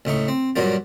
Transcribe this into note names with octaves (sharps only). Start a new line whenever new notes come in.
C#2 A2 D#4 C#6
C4
G2 A#2 F3 F#3 A#3 F4